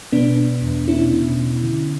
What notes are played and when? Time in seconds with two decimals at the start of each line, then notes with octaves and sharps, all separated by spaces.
0.12 B2 B3 D4
0.38 B2
0.62 E2
0.88 B2 C#4 E4
1.13 B2
1.38 B2
1.63 D3